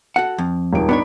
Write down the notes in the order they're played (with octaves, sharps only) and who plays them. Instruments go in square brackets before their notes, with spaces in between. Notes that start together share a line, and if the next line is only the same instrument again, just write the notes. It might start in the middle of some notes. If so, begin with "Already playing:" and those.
[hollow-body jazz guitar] F#4 A4 F#5
F2
[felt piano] D#1 G#2 D7
[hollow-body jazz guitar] B3 D4 C#5 [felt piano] D#4 D5 B5